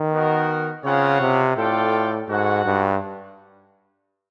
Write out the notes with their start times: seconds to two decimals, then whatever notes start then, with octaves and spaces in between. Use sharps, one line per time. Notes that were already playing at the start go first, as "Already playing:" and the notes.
Already playing: D#3
0.12 B3 D#4 F#4 A#4
0.84 C#3 C4 F4 G#4 C#5 F#5
1.20 C3
1.57 A2 F4 A4 D5 G5
2.29 G#2 F#4 A4 C#5 F#5
2.66 G2